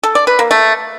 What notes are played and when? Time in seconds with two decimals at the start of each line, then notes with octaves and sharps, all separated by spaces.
0.03 A4
0.15 D5
0.27 B4
0.39 A#3
0.51 A3